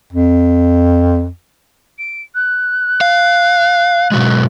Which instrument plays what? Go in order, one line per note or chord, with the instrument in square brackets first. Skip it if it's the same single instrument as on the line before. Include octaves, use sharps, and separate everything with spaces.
[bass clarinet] F2
[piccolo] D7
F#6
[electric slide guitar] F5
B2 F#3 G#3